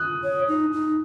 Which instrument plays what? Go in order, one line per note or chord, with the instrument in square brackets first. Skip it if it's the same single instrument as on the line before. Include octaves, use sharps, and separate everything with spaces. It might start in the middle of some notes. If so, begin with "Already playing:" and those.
Already playing: [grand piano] D#6 F#6
[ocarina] C#5
D#4
D#4